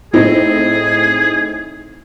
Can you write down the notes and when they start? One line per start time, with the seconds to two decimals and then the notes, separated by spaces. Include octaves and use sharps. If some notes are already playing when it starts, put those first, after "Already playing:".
0.13 A2 C4 D#4 G#4